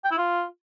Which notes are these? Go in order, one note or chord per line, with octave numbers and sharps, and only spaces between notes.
G5
E4
F4